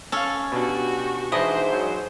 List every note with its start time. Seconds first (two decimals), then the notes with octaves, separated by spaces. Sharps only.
0.12 C#4 A4 F5 A5
0.52 B2 D4 F#4 G4
1.32 G#2 E3 D4 E4 C5 D#5
1.73 F#3